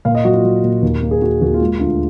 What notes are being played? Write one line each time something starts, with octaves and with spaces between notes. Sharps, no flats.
A#2 F5
D#5
F#3 F#4
F4
F#3
A#2
D#2
A#3
G#4
A#3 F#4
D#2 F#4
F4
G#3
D2 F4